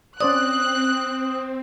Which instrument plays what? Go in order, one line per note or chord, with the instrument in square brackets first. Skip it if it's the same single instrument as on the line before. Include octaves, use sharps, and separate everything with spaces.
[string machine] C4 [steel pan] C#4 C5 D5 [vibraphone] D#6 [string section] F#6